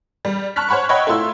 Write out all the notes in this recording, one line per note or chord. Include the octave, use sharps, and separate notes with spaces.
G3
A5 C#6 F6 F#6 B6
C5 C#5 F#5 B5 C#6
C#5 D#5 E5 F#5 G5 B5
A3 E4 F4 C6 E6